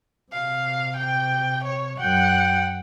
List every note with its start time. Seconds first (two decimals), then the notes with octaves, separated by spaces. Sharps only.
0.32 C3 F5
0.97 G5
1.64 C#5
2.00 F#2 F#5 G5